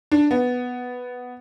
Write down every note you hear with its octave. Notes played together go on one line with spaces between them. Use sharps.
D4
B3